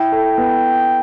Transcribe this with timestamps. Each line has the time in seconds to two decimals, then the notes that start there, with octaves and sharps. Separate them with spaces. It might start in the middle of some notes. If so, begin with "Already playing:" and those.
Already playing: E4 G5
0.12 A4
0.38 B3